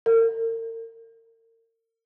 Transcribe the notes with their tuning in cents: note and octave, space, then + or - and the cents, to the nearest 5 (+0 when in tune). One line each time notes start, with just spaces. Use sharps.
A#4 -40